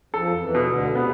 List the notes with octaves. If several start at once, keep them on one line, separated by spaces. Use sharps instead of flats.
F2 F3 A4
E2 E3
B2
D2 D3
C3 B3